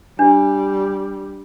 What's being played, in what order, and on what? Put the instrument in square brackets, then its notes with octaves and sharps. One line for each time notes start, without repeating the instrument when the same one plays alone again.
[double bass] G3 [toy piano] D4